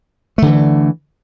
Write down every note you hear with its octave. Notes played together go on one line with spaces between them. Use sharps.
D3 E3 A3